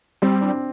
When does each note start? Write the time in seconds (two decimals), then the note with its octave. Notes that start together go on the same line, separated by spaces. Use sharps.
0.22 G3 C4
0.42 D4